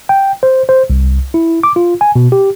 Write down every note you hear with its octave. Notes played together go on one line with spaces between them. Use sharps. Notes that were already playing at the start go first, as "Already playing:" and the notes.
G5
C5
C5
C2
E4
D6
F4
G#5
B2
G4